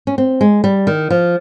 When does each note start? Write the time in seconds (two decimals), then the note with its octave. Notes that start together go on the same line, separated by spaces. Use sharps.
0.07 C#4
0.18 C4
0.41 G#3
0.64 G3
0.87 D#3
1.10 F3